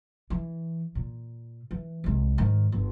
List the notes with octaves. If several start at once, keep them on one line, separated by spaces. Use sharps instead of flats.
E3
A#2
E3
C2 G#3
G#2 D#3
G1